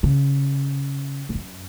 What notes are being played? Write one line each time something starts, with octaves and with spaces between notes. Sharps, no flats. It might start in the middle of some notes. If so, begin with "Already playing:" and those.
C#3
G#2
F#2